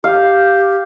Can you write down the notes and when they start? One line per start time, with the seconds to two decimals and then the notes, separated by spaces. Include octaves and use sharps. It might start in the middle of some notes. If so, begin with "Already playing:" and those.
0.04 G4 F5